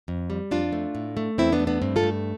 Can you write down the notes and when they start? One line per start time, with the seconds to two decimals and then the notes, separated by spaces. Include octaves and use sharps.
0.08 F2
0.30 G3
0.51 F2 D4 F4
0.72 A3
0.95 A2
1.17 A3
1.38 E2 C4 E4
1.52 B3 D4
1.60 A3
1.67 B3 D4
1.82 G2 C4
1.96 F4 A4
2.03 A3